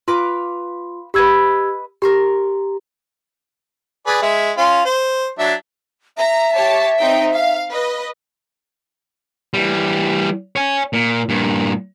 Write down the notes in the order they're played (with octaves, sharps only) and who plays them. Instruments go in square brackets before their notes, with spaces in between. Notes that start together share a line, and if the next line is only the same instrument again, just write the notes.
[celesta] F4 C6 [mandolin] B4 F5 D6
[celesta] G4 E6 G#6 [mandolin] B4 D#5 B5
[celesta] G4 [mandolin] A#4 A#5 C6
[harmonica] G#4 B4 D5
G#3 E5
C#4 F4 C6
C5
F#3 D4 E5
[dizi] E5 [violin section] A#5
[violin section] G4 C#5 A5
C4 D#4 G5
F5
B4 D#5
[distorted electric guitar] E3 G3
C#5 G#5
A#2
G2 A#2